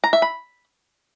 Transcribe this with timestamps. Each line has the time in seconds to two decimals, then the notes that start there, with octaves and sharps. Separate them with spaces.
0.04 A#5
0.13 E5
0.22 B5